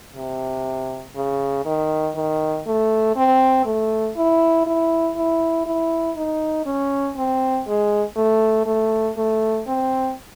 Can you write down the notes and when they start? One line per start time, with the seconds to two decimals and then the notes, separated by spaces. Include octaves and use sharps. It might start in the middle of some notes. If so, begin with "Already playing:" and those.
0.16 C3
1.16 C#3
1.65 D#3
2.15 D#3
2.67 A3
3.16 C4
3.66 A3
4.17 E4
4.66 E4
5.17 E4
5.66 E4
6.16 D#4
6.66 C#4
7.16 C4
7.67 G#3
8.16 A3
8.66 A3
9.17 A3
9.67 C4